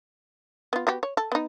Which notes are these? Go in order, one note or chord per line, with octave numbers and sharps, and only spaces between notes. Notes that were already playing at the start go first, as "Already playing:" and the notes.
B3 F4
B3 F#4 G4
C#5
A4
B3 D#4